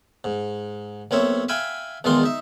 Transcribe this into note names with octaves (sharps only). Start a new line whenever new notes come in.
G#2
B1 A#3 C4 C#5 E5
E5 F5 G5 G#5 B5
E2 B2 D#3 G#3 F4 C6
D#4 E5